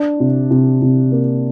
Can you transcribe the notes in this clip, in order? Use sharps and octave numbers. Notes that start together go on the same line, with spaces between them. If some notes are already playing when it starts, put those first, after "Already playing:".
Already playing: D4
C3
C3
C3
A#3